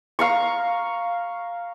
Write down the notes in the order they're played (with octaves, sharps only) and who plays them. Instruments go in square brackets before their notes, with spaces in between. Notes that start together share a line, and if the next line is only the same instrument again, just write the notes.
[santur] F5 A#5 C#6